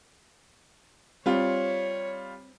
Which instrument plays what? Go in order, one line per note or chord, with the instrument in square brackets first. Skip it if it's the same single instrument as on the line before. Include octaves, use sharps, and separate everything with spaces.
[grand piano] G3 F4 [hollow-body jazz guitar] C4 [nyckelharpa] C#5